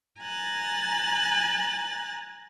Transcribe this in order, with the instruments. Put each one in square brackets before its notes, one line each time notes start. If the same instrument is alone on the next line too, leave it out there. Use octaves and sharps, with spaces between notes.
[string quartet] G#5 A#5 F#6 A6